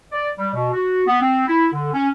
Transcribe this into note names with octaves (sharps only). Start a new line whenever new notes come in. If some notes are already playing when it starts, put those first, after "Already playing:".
D5
G3
B2
F#4
B3
C4
E4
D3
C#4